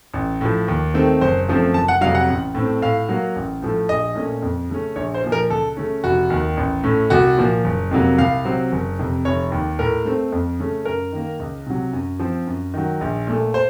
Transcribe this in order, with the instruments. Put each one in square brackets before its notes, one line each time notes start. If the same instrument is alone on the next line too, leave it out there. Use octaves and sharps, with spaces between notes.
[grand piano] A1
A2 F3
D#2
D#3 A3 C4
F#1 C5
F#2 F3 A3 C4
F#1 A5
F#5
F2 C3 F#3 F5
F#5
A1
A2 A3 C4
A2 F5
F#3 A#3
A1
A2 F3 A3
A#1 D#5
A#2 A3 C#4
F2
C#3 A3 C#4
A#1 C#5
C5
A#2 F3
A#4
C#2 A4
C#3 A3 C#4
F1 F#4
D#2 D#3
A1
A2 A3 C#4
C2 F#4
A#2 F3 A#3
F#1
F2 C3 F#3 A#3
C2 F5
C3 F#3 C4
F#1
F2 C3
F1 C#5
D#2 D#3
A2 A#4
A3 C4
F2
C#3 A3 C#4
F#2 A#4
D#3 A#3
C#2
C3 F#3
F#2
F3 C4
F#2
D#3 F#3
A#1
A#2 A3
C5